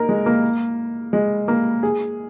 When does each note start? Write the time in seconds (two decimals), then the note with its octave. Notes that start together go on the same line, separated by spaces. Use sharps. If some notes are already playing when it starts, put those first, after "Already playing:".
Already playing: A#3 D#4 A#4
0.09 G#3
0.26 A#3
1.13 G#3
1.48 A#3
1.83 G#4